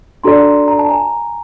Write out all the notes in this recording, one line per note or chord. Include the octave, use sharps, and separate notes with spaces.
D4 F#4 A4 D5 A#5 C6
A#5
A5
G#5 A#5